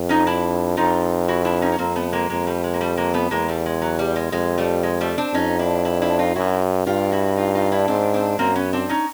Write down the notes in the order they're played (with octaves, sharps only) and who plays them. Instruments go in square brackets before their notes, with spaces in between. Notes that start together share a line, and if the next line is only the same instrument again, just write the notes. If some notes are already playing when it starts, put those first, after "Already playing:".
Already playing: [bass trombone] F2
[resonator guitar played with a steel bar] C#4 D#4
D4 E4
[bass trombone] F2 [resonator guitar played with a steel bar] D#4 F4
[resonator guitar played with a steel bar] E4 F#4
D4 E4
C#4 D#4
C#4
[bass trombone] F2 [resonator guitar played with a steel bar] A#3 C4
[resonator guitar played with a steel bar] A3 B3
G#3 A#3
[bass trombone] F2 [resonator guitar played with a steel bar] G#3 A#3
[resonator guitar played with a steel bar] G3 A3
G#3
A#3
G3 A3
G#3 A#3
A3 B3
[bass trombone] E2 [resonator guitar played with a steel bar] G#3 A#3
[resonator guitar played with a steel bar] G3 A3
G#3
F#3
G3
G#3
[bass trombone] F2 [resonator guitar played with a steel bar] G#3
[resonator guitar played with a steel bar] G3 A3
G#3
G3 A3
C4 D4
[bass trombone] F2 [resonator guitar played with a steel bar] C#4 D#4
[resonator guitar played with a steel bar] D4 E4
D4 E4
D4 E4
D#4 F4
[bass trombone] F#2 [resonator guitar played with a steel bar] E4 F#4
[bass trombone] G2 [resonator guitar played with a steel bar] F4 G4
[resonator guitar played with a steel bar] E4 F#4
D#4 F4
D#4 F4
D4 E4
[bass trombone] G#2 [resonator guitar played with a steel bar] C4 D4
[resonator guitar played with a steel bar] C4 D4
[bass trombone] F#2 [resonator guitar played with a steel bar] A#3 C4
[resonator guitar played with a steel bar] B3 C#4
C4 D4
C#4 D#4